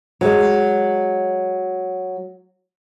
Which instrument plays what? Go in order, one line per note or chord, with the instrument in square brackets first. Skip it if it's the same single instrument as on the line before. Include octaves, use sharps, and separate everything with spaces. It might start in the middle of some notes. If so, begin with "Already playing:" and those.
[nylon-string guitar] F#3 G#3